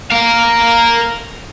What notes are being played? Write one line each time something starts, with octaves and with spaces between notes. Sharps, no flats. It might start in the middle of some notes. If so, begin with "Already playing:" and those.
A#4 F5